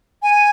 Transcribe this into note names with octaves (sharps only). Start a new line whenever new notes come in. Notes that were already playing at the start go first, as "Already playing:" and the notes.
G#5